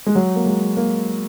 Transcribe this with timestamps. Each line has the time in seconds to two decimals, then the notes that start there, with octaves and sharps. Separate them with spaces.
0.06 G#3
0.15 F#3
0.36 A#3
0.46 G#3
0.77 A#3